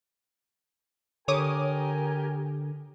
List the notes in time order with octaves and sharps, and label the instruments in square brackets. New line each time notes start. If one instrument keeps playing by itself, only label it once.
[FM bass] D3 [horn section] G4 A#4 G#5 [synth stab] C#5 D6 D#6